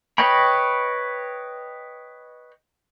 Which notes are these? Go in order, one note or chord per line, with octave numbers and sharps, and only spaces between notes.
B4 C#5 D#5 G5 B5